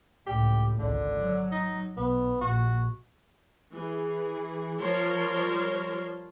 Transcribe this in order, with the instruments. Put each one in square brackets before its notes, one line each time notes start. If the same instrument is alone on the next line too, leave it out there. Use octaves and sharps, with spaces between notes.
[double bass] C#2 A2 [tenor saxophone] G4
[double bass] G#1 C#2 [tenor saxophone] D3
[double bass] F#3
[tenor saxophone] D#4
[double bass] B1 [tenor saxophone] B3
[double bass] A#1 [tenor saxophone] F#4
[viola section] E3 G#4
F3 G3 A#4 C#5 A5 C6